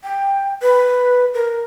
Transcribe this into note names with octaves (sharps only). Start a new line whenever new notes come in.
G5
B4
A#4